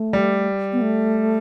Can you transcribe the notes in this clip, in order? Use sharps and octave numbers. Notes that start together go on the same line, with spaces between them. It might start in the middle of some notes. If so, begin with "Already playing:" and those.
Already playing: A3
G3
B3
A3